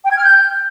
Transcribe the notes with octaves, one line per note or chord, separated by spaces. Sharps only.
G5
G#6
F6
G6